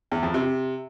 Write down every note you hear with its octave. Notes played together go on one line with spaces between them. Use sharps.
E2
F2
C3